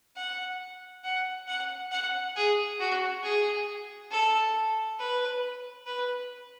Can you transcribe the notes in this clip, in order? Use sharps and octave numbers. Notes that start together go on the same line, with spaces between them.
F#5
F#5
F#5
F#5
G#4
F#4
G#4
A4
B4
B4